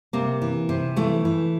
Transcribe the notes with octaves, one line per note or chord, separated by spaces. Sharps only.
C3 A#3
E3
C3
E3 A3
E3